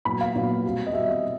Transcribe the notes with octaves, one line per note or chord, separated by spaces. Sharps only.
A#2 F#3 B3 B5
F5
A#2 F#3 B3
B2 G3 C4
D#5
B2 G3 C4 E5
D#5